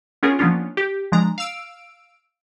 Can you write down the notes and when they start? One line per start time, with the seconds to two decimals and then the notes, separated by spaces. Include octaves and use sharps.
0.23 B3 C#4 F4 G#4 A#4
0.39 F3 A#3 B3 C#4 D4 F4
0.77 G4
1.12 F3 G#3 D4 A#5
1.38 F5 E6 D7